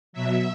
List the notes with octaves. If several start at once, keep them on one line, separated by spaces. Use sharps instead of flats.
B2 F#3 E5